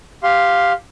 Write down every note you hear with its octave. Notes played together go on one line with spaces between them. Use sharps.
G4 F5 C6